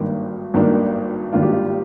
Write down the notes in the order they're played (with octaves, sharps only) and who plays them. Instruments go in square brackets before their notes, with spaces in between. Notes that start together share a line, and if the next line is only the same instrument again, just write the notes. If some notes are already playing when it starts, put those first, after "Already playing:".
Already playing: [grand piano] G#1 G2 D#3 A#3 D4
G#1 G2 D#3 A#3 D4
G#1 G2 D#3 A#3 D4 F4
G4
F4